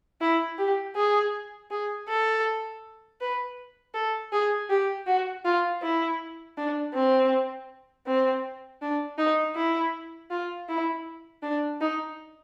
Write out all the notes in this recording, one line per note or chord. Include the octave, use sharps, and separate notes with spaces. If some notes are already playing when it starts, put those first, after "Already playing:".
E4
G4
G#4
G#4
A4
B4
A4
G#4
G4
F#4
F4
E4
D4
C4
C4
D4
D#4
E4
F4
E4
D4
D#4